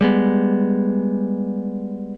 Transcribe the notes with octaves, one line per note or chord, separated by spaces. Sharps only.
G3 G#3 B3